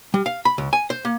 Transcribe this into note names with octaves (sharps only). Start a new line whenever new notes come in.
G3
F5
B5
C#2
G#5
C5
A#3